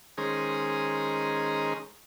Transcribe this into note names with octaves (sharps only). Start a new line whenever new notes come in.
D#3 G#3 C#4 G#4 C5 A#5